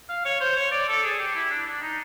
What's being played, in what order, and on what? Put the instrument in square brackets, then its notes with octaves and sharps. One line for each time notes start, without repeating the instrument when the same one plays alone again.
[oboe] F5
C#5
C5
C#5
D5
A4
G#4
G4
E4
D4
D4
D#4